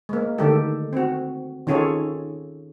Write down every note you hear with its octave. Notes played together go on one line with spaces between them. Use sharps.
G#3 A#3
D3 D#3 G#3 A3 G4 A4
C4 F#4
D#3 C#4 F4 G#4 A4 C#5